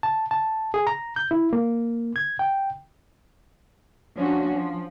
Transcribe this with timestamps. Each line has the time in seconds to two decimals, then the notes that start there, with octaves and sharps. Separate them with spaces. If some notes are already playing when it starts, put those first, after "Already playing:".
0.03 A5
0.31 A5
0.74 G#4
0.87 A#5
1.16 G6
1.31 E4
1.53 A#3
2.16 G#6
2.39 G5
4.15 F3 C#4 D4 F#4
4.51 F3